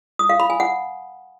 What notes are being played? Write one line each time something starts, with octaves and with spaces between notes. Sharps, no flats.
D#6
F5
B5
G#5
F#5